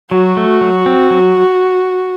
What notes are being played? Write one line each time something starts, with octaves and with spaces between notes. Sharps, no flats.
F#3 F#4
A3
F#3
C4
F#3